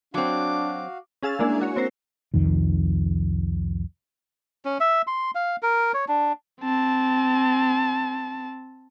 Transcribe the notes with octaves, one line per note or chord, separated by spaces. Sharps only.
F#3 C4 D4 F#4 F5 D6
C#4 G#4 F5 E6 A6
G#3 A#3 D4 E4 G#4
F#4 C#5
C4 A#4 C5
C2 F2 D#3
C#4
E5
C6
F5
A#4
C#5
D4
C4 A5